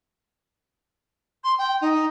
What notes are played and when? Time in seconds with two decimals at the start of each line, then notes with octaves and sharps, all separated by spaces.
1.44 C6
1.58 G5
1.81 D#4